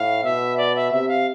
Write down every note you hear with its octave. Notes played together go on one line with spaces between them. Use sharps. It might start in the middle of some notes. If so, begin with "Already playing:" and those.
Already playing: A2 F5
B2 E5
D5
E5
C3 E5
F5